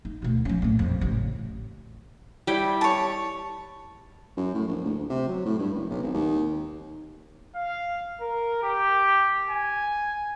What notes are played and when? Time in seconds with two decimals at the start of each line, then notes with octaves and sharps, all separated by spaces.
0.05 D#4
0.22 D2 B2
0.45 F3 C#4
0.62 A#1 A2
0.79 F2
1.01 A1 C#3
2.47 G3 E4 G5
2.81 C#5 A5
4.37 F#2
4.54 A2
4.67 A#1
4.84 D2
5.09 C3
5.28 F#3
5.45 A2
5.59 G2
5.74 F#1
5.90 B1
6.02 G#1
6.14 D#2
7.55 F5
8.21 A#4
8.63 G4
9.50 G#5